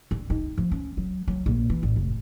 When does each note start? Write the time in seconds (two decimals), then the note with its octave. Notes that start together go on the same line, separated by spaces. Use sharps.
0.11 D4
0.30 D#4
0.58 F3
0.72 C#4
0.97 F#3
1.28 F#3
1.46 A#1
1.70 E3
1.83 A1
1.96 F1